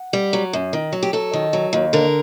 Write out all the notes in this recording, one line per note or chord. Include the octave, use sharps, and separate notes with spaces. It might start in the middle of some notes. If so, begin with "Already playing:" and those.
Already playing: F#5
G3
F#3
F#2
D#3
F#3
G4
F#3 A4
D#3
F#3
D#2
D3 A#4